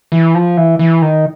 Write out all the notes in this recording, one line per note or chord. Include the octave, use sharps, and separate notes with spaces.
E3
F3
E3
E3
D#3